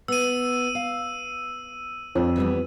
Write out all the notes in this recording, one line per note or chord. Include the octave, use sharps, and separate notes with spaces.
B3 E6 D#7
F5
F2 D4
E3 G3 B3